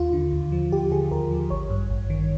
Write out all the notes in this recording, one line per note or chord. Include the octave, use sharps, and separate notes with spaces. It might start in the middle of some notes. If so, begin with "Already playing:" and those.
Already playing: D#2 F4
D3
D#2
F3
D#2 G4
D3 G#4
D#2 A#4
F3
A1 C#5
G2
A1
D#3